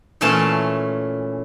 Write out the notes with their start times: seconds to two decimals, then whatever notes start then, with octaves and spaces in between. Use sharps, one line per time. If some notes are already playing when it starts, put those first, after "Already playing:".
0.21 A#2 E3 A3 C#4 A5 C6